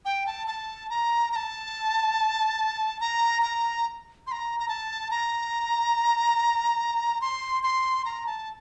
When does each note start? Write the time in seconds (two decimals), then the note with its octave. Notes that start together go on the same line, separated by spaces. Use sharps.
0.05 G5
0.26 A5
0.47 A5
0.90 A#5
1.32 A#5
1.36 A5
3.00 A#5
3.42 A#5
4.27 C6
4.32 A#5
4.60 A#5
4.69 A5
5.11 A#5
7.21 C6
7.63 C6
8.05 A#5
8.27 A5